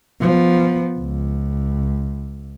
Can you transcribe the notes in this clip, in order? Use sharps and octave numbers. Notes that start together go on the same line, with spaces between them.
F3 B3
C#2